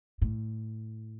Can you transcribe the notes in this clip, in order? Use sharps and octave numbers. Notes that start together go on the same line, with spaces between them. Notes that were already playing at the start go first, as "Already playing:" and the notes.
A2